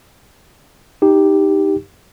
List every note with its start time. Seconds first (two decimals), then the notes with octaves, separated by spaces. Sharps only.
1.02 D#4 G4